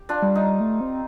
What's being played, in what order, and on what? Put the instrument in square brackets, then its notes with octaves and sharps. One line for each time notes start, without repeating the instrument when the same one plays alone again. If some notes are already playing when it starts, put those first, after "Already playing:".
Already playing: [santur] G4
D4 F4
[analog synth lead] G3
[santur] D#4
[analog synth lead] A3
C4